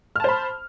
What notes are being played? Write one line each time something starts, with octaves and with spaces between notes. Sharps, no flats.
C5 A5 B5 F6